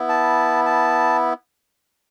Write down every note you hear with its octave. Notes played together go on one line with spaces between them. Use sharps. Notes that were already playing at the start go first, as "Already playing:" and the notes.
Already playing: B3 E4
A5
A5